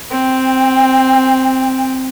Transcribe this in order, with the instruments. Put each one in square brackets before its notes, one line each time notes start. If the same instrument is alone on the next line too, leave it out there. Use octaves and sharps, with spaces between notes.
[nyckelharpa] C4 [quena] G5